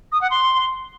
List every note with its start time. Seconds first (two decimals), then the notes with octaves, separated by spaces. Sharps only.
0.12 D#6
0.21 F#5
0.31 C6